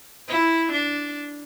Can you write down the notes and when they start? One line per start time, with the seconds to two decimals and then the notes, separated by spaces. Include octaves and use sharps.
0.28 E4
0.73 D4